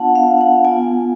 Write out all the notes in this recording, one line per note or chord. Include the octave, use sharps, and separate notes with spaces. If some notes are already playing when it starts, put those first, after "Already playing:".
Already playing: B3 D4 F4 F#5 A5
F5
F#5
B3 F4 G#5